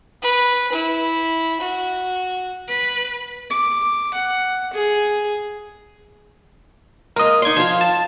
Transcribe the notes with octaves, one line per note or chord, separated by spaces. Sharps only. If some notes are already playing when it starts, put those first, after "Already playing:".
B4
E4
F#4
B4
D6
F#5
G#4
G#3 A#3 A#4 D#5
D#4 D5 C6 G#6
F3 F4
A5